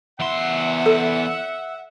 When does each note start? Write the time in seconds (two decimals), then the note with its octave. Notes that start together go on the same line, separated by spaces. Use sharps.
0.20 E2 E5 F#5 C6
0.86 A4